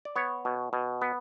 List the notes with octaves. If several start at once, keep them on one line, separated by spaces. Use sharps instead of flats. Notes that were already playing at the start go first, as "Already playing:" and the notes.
D5
B3 C#5
B2
B2
B3